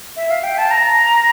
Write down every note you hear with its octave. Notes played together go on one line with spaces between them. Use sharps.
E5
F5
G5
A5
A#5